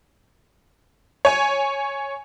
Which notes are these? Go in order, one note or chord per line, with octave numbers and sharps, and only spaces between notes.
C#5 G#5